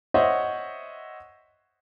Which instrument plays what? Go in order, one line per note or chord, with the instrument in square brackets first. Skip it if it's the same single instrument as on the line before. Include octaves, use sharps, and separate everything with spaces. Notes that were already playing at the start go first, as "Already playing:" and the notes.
[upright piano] C5 C#5 D#5 E5 F#5